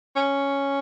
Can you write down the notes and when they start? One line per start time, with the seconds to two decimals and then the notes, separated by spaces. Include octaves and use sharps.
0.16 C#4